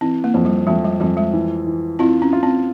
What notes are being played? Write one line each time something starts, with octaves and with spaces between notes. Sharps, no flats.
E3 C4
A#3
F2
G3
F2 G#3
G3
F2 G3
G#3
E3
E3
C4 E4 F4
C#4
F4
C4